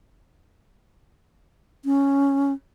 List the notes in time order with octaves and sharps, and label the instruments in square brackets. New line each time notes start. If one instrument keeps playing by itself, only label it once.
[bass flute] C#4